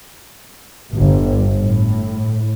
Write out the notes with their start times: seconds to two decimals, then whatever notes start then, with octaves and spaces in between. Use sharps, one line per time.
0.93 G1
1.56 A2